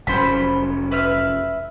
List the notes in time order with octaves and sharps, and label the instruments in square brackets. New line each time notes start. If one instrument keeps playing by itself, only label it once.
[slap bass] F1 F#3 C#4 [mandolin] C5 B5
[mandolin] B4 E5 F6